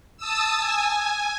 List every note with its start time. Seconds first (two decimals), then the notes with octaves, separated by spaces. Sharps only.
0.17 A5 D#6 E6
0.59 G#5